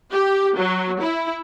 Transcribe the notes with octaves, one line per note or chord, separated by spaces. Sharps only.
G4
F#3
E4